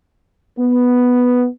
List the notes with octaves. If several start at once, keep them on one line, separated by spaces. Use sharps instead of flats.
B3